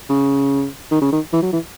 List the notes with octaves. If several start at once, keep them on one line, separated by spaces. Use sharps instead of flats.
C#3
D#3
C#3
D#3
E3
F#3
E3